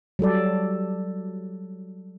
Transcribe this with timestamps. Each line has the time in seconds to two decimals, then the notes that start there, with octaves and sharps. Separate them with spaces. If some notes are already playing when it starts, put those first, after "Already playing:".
0.19 F#3 G3 A4 D5